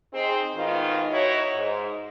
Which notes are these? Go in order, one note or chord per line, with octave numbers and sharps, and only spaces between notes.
C4 D#4 G#4
G#2 B2 D#3 B3 D#4 F4
D#4 E4 F#4 C#5
G#2